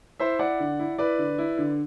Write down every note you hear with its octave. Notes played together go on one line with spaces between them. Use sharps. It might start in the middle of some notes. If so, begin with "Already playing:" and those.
E4 C5 E5
E4 D5 F#5
D3
E4
E4 B4 D5
D3
E4
D3